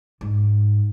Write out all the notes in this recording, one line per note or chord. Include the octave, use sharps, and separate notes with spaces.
G#2